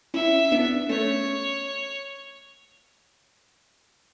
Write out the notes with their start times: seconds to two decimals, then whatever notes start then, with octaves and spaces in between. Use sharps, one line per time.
0.14 C#4 E4 E5
0.52 B3 D4
0.89 A3 C#4 C#5